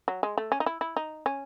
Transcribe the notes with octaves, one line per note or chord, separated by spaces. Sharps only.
F#3
G#3
A3
C#4
D#4
E4
E4
D#4
C#4